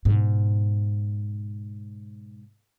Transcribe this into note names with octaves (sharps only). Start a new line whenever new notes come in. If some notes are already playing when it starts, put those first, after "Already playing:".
G#2 B2